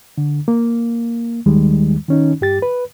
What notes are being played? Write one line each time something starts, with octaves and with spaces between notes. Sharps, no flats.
D3
A#3
D#2 D#3 G3 G#3
D#3 C#4 D#4
G2 G4 A6
B4